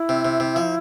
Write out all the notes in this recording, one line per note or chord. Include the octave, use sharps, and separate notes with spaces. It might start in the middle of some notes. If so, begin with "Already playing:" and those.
Already playing: E4
C3
C3
C3
F3